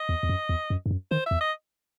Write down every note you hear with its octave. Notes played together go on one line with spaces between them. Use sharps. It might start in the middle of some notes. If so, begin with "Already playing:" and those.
Already playing: D#5
E2
E2
F#2
E2
F#2
G2
F#2
D#3 C5
E2 E5
D#5